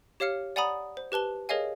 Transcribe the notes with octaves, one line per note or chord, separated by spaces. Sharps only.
G4 C#5 F5 F6 C#7
D5 F#5 G#5 A#5 B5 D#6
C5
G4 B4 A5 G7
G#4 A#4 C#5 D#5 F5 G#5